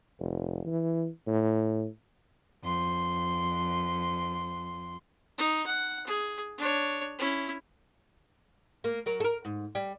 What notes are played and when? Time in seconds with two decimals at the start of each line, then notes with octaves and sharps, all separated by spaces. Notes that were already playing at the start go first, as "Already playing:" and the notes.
0.19 F1
0.66 E3
1.27 A2
2.64 F2 C6
5.38 D#4
5.66 F#5
6.07 G#4
6.58 D4 C#5
7.19 C#4 E4
8.84 A#3
9.06 F#3 A#4
9.20 A4 A#4
9.45 G#2
9.75 G3